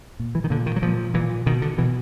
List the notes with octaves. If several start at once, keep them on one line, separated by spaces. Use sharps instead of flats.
A#2
E3
D#3
A#2 D3
D#3
F#3
A#2 F3
A#2 E3
B2 D#3
D3
B2 E3